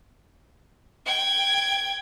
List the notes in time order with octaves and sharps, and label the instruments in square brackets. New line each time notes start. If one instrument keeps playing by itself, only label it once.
[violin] G5 G#6